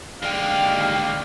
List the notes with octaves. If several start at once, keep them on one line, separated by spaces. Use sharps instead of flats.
D#2 D3 G#3 D5 F5 G5